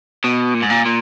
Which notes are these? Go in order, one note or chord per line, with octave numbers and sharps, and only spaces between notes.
B2
A#2
G#2
A#2
A#2